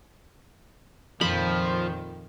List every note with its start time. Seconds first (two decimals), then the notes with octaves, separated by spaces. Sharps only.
1.21 F2 A#2 D#3 F3 B5